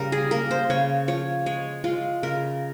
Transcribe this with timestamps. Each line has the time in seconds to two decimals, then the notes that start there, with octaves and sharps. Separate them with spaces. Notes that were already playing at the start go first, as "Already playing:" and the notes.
Already playing: C#3 G3 A#3 A#4
0.12 G#4
0.31 A#3 A#4
0.51 C5
0.70 C#3 C#5
1.08 F3 C#5
1.46 G#3 C#5
1.84 G#3 F4
2.23 C#3 A#4